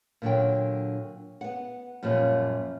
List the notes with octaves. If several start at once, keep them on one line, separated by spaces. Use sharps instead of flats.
A#2 D3 F#3 G5
B3 F#5
F#2 A#2 F3 G3 C4